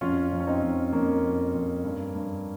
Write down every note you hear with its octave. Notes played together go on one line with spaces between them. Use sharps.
F2 C#4 F4
F2
C#4
C4 D#4
F2
F2 A#3 C#4
F2
F2
G2
G2